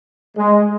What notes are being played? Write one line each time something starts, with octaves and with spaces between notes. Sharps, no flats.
G#3